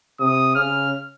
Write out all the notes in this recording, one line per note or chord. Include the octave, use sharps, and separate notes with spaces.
C3 D#6
C#3 F6